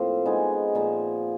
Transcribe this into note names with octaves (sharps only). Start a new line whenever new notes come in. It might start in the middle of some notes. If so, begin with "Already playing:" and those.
Already playing: A2 F3 A#3 C4
G#3 B3 D#4 G#4
A#2 F3 A#3